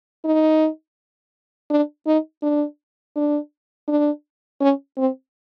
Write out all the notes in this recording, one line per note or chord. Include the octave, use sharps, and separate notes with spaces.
D#4
D4
D#4
D4
D4
D4
C#4
C4